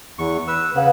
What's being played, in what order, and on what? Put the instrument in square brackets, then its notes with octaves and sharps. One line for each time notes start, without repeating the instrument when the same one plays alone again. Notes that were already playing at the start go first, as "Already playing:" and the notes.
[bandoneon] E2 C#6
B4 E6
[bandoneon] C#3 [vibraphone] B4 F5 F#5